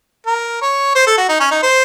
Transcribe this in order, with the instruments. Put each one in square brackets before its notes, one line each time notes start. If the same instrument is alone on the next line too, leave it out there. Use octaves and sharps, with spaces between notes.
[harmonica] A#4
C#5
C5
A4
F#4
D#4
C#4
D#4
C5